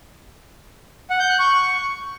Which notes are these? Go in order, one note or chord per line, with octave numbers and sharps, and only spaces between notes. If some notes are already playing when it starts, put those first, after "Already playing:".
F#5
G6
F#6
C#6